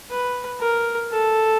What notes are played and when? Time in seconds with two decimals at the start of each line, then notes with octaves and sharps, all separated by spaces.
0.10 B4
0.60 A#4
1.11 A4